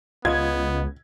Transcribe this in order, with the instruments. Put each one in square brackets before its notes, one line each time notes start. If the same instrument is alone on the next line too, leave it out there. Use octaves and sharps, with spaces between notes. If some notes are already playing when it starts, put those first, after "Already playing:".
[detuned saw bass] C#2 [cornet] B3 [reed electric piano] F4 D#5 [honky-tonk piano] G#6